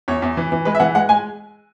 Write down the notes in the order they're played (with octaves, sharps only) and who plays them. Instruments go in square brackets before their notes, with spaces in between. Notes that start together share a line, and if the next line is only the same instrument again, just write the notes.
[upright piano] E2 C#5
E2
E3
E3
G#3 B4
E5
E3 F#5
G#3 F#5
G#3 G#5